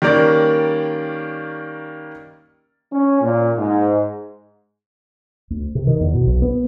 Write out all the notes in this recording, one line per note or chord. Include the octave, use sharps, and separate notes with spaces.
D#3 G3 A#3 C#4 A#4 D5
C#4
A#2
G#2
D2
C3
D#3
E2
B2
B1
B3